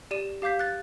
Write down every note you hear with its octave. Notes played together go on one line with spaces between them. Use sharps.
G4 D5 D#7 E7
G4 F5 D6 G6 B6
F#6 A6